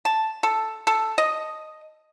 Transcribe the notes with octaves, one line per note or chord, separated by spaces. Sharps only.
A5
A4
A4
D#5